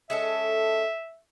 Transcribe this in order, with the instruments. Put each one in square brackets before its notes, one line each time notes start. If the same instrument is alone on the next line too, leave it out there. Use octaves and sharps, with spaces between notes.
[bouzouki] G#3 C#4 A4 [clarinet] E5